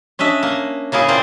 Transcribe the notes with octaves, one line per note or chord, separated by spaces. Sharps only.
C#4 D4 D#5 E5
A#3
C#3 A#3 E4 G#4
A#2 A#3 C4 D5